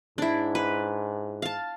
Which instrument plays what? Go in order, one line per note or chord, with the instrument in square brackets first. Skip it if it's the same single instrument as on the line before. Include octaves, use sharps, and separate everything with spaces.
[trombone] G#2 [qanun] D4 E4
[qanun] B4
F5 A5